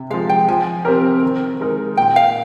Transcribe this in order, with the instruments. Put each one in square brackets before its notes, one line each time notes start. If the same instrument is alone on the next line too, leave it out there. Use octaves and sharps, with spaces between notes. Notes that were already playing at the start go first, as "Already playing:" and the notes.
Already playing: [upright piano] C3
[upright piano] F3 G#3 [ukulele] F5
[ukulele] G5
[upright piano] F3 [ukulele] G#5
[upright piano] C4 G4 A#4
D#3
G#3 D#4 A#4
[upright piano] A#2 [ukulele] G5
[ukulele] F5